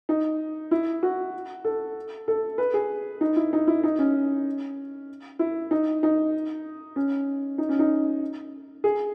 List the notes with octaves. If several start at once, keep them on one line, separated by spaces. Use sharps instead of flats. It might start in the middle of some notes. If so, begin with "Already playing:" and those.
D#4
E4
F#4
A4
A4
B4
G#4
D#4
E4
D#4
E4
D#4
C#4
E4
D#4
D#4
C#4
D#4
C#4
D#4
G#4